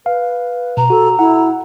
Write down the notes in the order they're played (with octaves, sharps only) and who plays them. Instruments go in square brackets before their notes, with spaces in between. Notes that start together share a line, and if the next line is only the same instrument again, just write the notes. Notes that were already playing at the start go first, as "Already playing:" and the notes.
[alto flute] B4 [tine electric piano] F5
[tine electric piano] B2 [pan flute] A#5
[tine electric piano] F#4 [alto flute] A4
[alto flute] E4 [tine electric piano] F#5